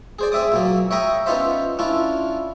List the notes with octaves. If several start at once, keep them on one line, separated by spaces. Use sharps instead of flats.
G#4 C5 D5
C4 G#4 E5 D6 D#6
A#2 F#3 A#3
C#5 E5 G5 A#5 B5 D#6
B3 C#4 D#4 F4 C5 E5
C#4 D4 E4 F4